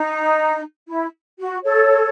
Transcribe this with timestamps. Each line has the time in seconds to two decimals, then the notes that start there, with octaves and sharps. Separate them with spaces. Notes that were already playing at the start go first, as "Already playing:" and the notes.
Already playing: D#4
0.87 E4
1.38 F#4
1.63 A4 C#5